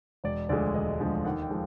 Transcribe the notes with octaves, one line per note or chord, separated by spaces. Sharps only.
E1 D5
D2 D3 F3 G#3 D5
E1 D#5
D2 D3 F3 G#3
D#2 F#5
G5
F3 G#3